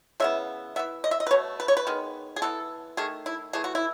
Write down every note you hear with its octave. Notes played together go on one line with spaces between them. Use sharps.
C#3 E3 B3 E5
E3 B3 E5
D#5
E5
D#5
B4
B2 A3 C#5
B4
C#5
B4
D#3 G#3 B3
G#4
E3 B3 A4
D#3 A3 G#4
E4
E3 A3 G#4
F#4
E4